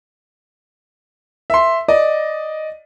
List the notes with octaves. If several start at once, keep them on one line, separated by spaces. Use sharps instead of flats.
E5 C6
D5 D#5